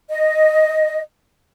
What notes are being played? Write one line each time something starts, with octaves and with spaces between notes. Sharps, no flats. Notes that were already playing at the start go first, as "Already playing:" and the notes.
D#5